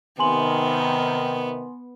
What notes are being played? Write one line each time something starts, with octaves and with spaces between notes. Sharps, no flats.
C3 D#3 B3 G#5 C6 F#7